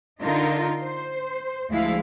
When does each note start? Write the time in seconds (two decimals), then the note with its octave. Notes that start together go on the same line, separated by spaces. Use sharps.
0.20 D3 D#4 F4 A#4
0.77 C5
1.70 D2 F3 G#3 E4 F5